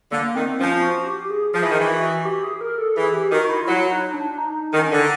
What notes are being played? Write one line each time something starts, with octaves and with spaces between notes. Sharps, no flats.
D3 A#3
D#3 C4
F3 C#4
F4
F#4
G4
G#4
F3 G#4
E3
D#3
E3
F#4
G4
G#4
A#4
A4
E3 G#4
G4
D#3 F#4
E4
F4
F#3 E4
D#4
D4
D#4
D#3
C#4
D3 D4
D#4